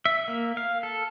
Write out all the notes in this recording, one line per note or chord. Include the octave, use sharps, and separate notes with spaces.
E5
A#3
F5
A4